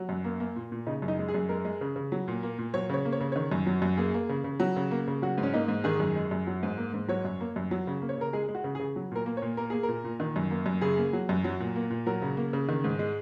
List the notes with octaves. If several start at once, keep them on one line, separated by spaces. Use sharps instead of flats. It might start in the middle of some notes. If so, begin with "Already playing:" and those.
Already playing: F#3
F#2
A#3
A#3
A#2
A#2
C#3 D#4
F#2
D#4
G#3
G#4
F#2
G#3 A#4
G#3
C#3
C#3
F#3
A#2
A#3
A#2
F#3 C#5
C#3 C#5
A#3
C#5
C#3
D#3 C#5
F#2
F#3
F#2
A#3 G#4
A#3
C#3
C#3
F#3
C#3
A#3
C#3
F#3 F#4
G#2
C#4
A#3 D#4
G#2
D#3 G#4
F#2
G#3
F#2
F#3
G#2
A#3
G#2
F#3 C#5
F#2
A#3
F#2
F#3
C#3
A#3
C#5
C#3 A#4
G#3 G#4
G#3
F#4
C#3
G#4
C#3
F#3
A#2 A#4
A#3
C#5
A#2
A#3 A#4
A#3 G#4
A#4
A#2
A#2
D#3
F#2
A#3
F#2
C#3 G#4
A#3
F#3
F#2
F#3
A#2
A#3
A#2
F#3 A#4
C#3
A#3
C#3
D#3
G#2
G#3